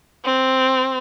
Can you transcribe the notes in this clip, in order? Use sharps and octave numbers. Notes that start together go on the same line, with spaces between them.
C4